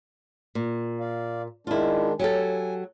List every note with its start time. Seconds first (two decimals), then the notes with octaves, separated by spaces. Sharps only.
0.55 A#2
1.00 D5 F5
1.67 D#3 G#3 D4 E4 F4
2.20 F#3 G4 A4 G#5